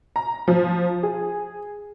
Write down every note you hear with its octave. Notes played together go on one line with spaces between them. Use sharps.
A#5
F3
G#4